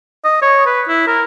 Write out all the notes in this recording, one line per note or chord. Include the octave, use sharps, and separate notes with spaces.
D#5
C#5
B4
E4
A#4